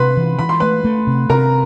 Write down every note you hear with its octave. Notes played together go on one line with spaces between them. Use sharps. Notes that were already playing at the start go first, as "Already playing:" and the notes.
Already playing: C3 B4 B5 C6
E3
E3 B5
C6
A3 B4 B5
A3
C3
C3 A#4 A#5